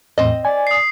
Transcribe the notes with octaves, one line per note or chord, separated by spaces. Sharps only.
E2 A2 C4 D#5
D5 G#5
D#6 C7